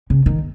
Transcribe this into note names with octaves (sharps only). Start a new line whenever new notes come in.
C#3
D#3